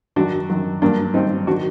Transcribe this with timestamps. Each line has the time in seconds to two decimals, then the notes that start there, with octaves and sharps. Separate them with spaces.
0.16 F#2 D#3 F#3 D4 F#4
0.50 F#2 D#3 F#3
0.82 G2 F#3 A#3 D4
1.14 G2 F#3 C4 D#4
1.47 D#3 F#3 D4 F#4